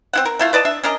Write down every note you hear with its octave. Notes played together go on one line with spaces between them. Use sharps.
C4 E4 F#5
A#4
A3 E4 F4
B4 D5 D#5 A5
D4 E5
C#4 D4 A#4 D#5